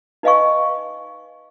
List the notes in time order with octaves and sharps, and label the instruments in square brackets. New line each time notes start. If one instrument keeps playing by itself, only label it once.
[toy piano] D#4 B4 D#5 F5 G#5 C#6